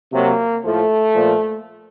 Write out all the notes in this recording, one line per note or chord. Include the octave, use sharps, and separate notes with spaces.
C3 F#3 A#3
A2 F3 A3
A#2 F3